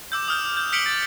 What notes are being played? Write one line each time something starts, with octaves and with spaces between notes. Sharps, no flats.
D6 E6 G6
D#6 F6 G6
G6
F6 B6 C#7 D7 F#7 G7
A6